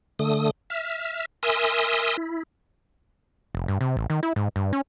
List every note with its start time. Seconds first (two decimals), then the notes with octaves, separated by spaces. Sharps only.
0.19 D3 A3 D#6
0.70 E5 F6
1.43 A#4 E5 G#5 C6 D#6 E6
2.17 E4
3.55 F1
3.68 G2
3.81 C3
3.97 A1
4.10 D#3
4.23 E4
4.36 G#2
4.56 G2
4.73 C#4